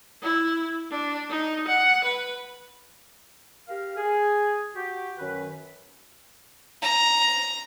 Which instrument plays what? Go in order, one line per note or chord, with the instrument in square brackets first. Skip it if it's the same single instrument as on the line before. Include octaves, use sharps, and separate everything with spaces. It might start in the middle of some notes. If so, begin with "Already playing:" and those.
[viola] E4
D4
D#4
F#5
B4
[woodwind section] G4 A#4 F5
G#4
F#4 G4
F#2 D#3 B4
[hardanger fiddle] A#5